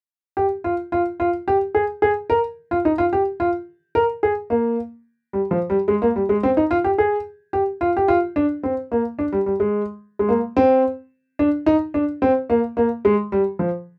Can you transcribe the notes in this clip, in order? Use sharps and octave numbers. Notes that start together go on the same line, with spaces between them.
G4
F4
F4
F4
G4
G#4
G#4
A#4
F4
D#4
F4
G4
F4
A#4
G#4
A#3
G3
F3
G3
G#3
A#3
G3
G#3
C4
D#4
F4
G4
G#4
G4
F4
G4
F4
D4
C4
A#3
D4
G3
G3
G#3
G#3
A#3
C4
D4
D#4
D4
C4
A#3
A#3
G#3
G3
F3